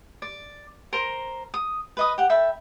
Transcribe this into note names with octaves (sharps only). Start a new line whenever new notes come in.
D5
A#4 C5 A#5
D#6
B4 D#5 D#6
G4 F#5
A4 E5 G5 B5